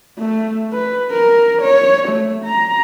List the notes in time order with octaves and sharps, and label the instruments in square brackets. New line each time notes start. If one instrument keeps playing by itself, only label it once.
[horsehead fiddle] A3
B4
A#4
C#5
A3
A#5